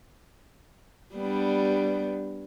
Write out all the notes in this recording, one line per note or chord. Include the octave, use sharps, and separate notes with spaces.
G3 B3 D4